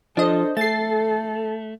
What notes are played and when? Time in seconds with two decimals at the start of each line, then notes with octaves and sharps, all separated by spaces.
0.17 F3 D4 A4 C5 D#5
0.57 A3 A4 A6 C7